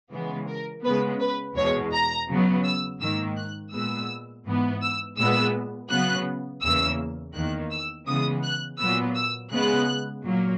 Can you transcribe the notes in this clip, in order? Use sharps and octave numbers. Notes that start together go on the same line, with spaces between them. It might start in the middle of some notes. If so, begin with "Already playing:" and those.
C#3 E3 G#3 B3
A#4
C#3 G#3 B3 B4
B4
E2 B2 G#3 C#5
A#5
C#3 F#3 B3
E6
G#2 D#3 A#3 E6
F#6
A#2 G#3 B3 E6
G#2 E3 B3
E6
A#2 G#3 B3 E6
C#3 F#3 B3 F#6
E2 C#3 E3 A#3 E6
E2 D#3 A#3 F#6
E6
C#3 E3 G#3 B3 D#6
F#6
A#2 F#3 B3 E6
E6
C#3 G#3 B3 F#6
A#2 F#3 A#3